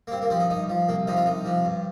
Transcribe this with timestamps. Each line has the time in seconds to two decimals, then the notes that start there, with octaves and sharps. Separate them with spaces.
0.07 A#3
0.11 G2 C4
0.22 A#3
0.30 F3 C4
0.40 D#4
0.50 G2 D#4
0.69 F3
0.89 C2 A#3
1.07 C3 F3 D#4
1.17 F4
1.26 C2 D#4
1.45 C3 F3
1.65 G2